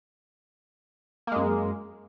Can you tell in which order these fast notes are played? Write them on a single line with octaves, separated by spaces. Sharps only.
A#3 G#3 F#2